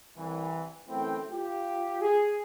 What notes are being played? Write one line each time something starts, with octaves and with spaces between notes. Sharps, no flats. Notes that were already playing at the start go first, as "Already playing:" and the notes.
C2 E3
F#2 E3 A3 C4 E4 G5
F4 G4
G#4